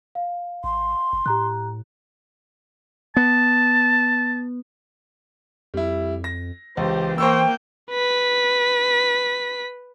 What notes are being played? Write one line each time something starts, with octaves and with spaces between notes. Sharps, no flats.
F5
G#1 C6
F1
A2 G4 A#5 F#6
B3 A5
F2 G3 E4
A#6
C#2 E3 G4 C5
A#3 C5 G5 C#6 E6
B4 B6